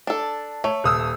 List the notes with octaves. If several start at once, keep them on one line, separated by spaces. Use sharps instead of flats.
D4 A4
A3 C#5
D#1 D#6 E6